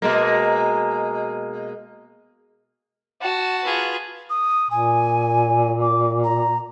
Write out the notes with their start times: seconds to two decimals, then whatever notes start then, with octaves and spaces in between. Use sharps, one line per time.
0.02 B2 G#3 A#3
3.21 F#4 A5
3.62 F4 G#4 B4
4.30 D#6
4.71 A#2 G#5
5.82 D6
6.24 A#5